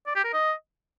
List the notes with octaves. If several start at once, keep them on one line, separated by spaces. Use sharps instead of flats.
D5
G4
A#4
D#5